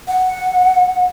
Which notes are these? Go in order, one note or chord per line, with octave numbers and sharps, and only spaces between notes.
F#5